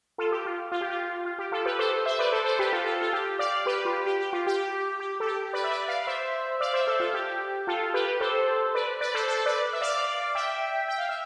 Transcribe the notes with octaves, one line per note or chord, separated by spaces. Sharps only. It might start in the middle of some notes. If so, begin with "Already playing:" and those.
F4 A4
G4
F4
F4
G4
F4
F4
G4
F4 A4
G4 B4
A4 C5
C5 E5
B4 D5
A4 C5
A4 C5
G4 B4
F4 A4
F4 A4
F4
G4
D5 F5
G4 B4
F4
G4
G4
G4
F4
G4
G4
A4
G4
B4 D5
E5
B4 D5
D5 F5
D5
C5 E5
D5 F5
C5 E5
A4 C5
F4 A4
G4
F4 A4
G4 B4
A4 C5
B4 D5
B4 D5
A4 C5
A4 C5
B4 D5
E5
D5 F5
E5 G5
G5
F5
E5